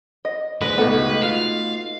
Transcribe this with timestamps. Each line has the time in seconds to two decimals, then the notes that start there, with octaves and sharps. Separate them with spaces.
0.25 D#5
0.62 D2 G#3 B4
0.78 C#2 B2 A3 B3 D#4 F#4 A4
1.23 F4 F5